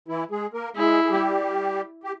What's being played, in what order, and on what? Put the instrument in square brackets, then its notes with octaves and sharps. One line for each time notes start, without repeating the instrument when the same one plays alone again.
[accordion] E3 E4
G#3 G#4
A#3 A#4
[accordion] G#3 G#4 [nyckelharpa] E4
[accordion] G#4
G3 G4
G4